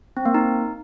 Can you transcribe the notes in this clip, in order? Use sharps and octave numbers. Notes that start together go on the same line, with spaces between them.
C4
A#3
D#4